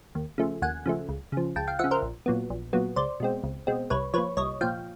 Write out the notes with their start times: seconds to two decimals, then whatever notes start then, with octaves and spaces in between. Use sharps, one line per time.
0.15 D#2
0.38 C#3 F3 A3
0.62 D#2 F#5 G#5
0.86 C#3 F3 A3
1.09 C#2
1.32 C#3 F3
1.56 C#2 G5 A5
1.68 F5 G5
1.79 C#3 F3 E5 F#5
1.91 A#4 C5
2.02 A#1
2.26 A#2 F#3 B3
2.50 A#1
2.73 A#2 F#3 B3
2.96 C#2 C5 D5
3.20 B2 G#3 C4
3.44 C#2
3.67 B2 G#3 C4
3.90 C2 B4 C#5
4.14 A#2 F3 B4 C#5
4.37 C2 C#5 D#5
4.61 A#2 F3 F5 G5